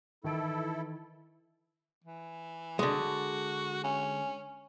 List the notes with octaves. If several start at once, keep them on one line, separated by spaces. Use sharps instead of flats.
D#3 E3 E4 A4 D7
E3
D3 G#3 F#4
C#4